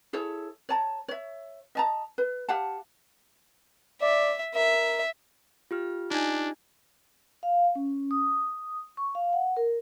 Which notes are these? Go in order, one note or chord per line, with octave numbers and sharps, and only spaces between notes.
E4 G#4 A4 C#5
C#5 A5 A#5
C#5 E5
D#5 A5 A#5
B4
G4 F5 F#5 A5
D5 E5
A#4 E5
F4 G4 F6
D4 D#4 G#5
F5
C#4
D#6
C#6
F5
F#5
A#4